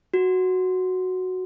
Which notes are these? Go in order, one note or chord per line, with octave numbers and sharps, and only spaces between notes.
F#4